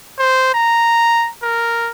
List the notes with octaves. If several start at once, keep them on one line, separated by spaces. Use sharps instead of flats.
C5
A#5
A#4